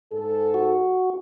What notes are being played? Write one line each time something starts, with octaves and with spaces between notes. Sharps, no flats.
G#2 A4
F#4